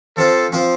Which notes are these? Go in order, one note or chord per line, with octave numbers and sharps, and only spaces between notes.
F3 C4 F4 A4 C5
F3 C4 F4 C5